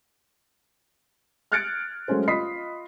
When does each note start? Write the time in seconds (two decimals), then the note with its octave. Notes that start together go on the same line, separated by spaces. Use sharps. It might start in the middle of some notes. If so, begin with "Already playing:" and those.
1.52 F6 F#6 G#6 A6 C#7 D7
2.08 F#3 G#3 A3 C#4 C5
2.28 F4 D#5 B5 D#6 B6 C7